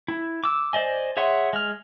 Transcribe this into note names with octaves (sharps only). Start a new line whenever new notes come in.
E4
D6 E6
C5 D5 D#5 G#5
G#4 C#5 E5 F#5 C6
G#3 F6